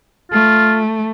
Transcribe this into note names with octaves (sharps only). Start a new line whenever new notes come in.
A3 F4